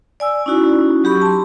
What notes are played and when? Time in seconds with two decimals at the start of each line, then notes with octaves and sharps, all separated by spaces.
0.20 D5 G#5 E6
0.46 C#4 D#4 E4 F#4
1.04 F#3 G4 B5 C#6
1.22 A5 C6